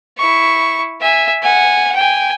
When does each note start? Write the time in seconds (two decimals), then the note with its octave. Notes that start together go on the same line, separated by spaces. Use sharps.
0.18 E4 C#6
1.02 E5 G#5
1.43 F#5 G#5
1.96 G5 G#5